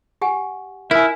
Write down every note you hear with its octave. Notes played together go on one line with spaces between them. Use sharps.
G4 F#5 G#5
E4 A#4 E5 G#5 F6 F#6